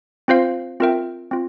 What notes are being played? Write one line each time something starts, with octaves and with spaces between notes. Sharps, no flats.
C4 F4 C5 F5
C4 F4 A#4 E5 G5
C4 F4